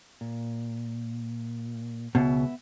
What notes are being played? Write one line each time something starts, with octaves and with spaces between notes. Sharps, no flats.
A#2
C#2 B2 B3 E5